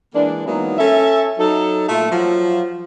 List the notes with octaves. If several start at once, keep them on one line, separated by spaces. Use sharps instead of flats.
E3 G#3 A#3 D4
E3 F#3 G#3 A#3 B3 D#4
C#4 A4 E5
F#3 D#4 A4
A#2 A3 F4 E5
F3 F#3 F4